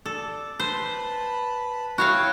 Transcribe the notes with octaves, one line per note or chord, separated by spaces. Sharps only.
A4 D5
B4 C5 A5 B5
E4 F#4 C#5 F5 G5